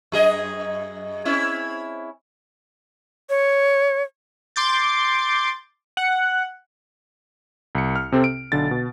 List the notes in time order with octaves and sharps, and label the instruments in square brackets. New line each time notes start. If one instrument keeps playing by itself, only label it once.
[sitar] F#2 G#4 D#5
C4 C#4 E4
[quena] C#5
[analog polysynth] C6 D6 G6 A6
F#5
[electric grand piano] C2 C#7
F6
C3 C4 A4
D7
B1 D3 A6
B2